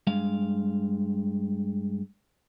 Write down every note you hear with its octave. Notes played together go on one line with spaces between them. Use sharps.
G2 G#3 F5